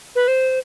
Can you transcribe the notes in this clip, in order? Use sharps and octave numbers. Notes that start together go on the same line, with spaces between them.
B4
C5